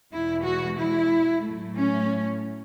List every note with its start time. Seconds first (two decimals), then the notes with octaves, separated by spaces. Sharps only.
0.12 E2 B2 G#3 E4
0.45 F#4
0.78 E4
1.42 A2 F#3 A3
1.76 C#4